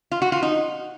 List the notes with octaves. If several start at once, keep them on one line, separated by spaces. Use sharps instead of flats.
F4
F#4
F4
D#4